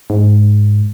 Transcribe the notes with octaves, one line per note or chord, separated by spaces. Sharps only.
G#2